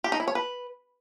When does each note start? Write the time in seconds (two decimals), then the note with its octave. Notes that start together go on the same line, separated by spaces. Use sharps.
0.04 G4
0.12 D#4
0.20 E4
0.28 C#5
0.35 B4